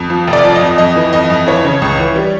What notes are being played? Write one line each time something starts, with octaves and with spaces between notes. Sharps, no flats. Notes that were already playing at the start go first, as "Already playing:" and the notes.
Already playing: F2
F3
F1
D5
F3
D#5
F2
F2 D#5
E3
F2 D#5
F2
E3 C#5
C#3
C#2
E3
G3